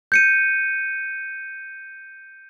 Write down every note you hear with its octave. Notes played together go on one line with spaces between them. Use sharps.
G6 C#7 D#7